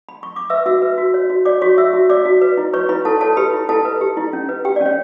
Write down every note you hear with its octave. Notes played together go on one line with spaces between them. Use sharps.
B5
C#6
D6
B4 E5 E6
F#4 E5 E6
B4
F#4
C#5
F#4
C#5 D5 D6
F#4 C#5 C#6
C#5 E5 E6
F#4
C#5 D5 D6
F#4
B4
E4
B4 C#5 C#6
E4 B4 B5
E4 A4 A5
A4 C#5 A5
G4 B4 B5
E4
E4 A4 A5
B4
G4
E4
C#4
B4
G4 G5
C#4 D5
C#5